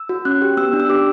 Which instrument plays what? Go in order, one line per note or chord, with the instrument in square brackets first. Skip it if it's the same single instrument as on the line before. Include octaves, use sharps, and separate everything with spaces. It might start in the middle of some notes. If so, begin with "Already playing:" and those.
Already playing: [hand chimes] E6
F#4
C#4 F#6
G4
B3 E6
D4
E6
G4 D6